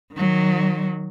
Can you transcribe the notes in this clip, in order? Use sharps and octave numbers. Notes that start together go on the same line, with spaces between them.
D#3 F#3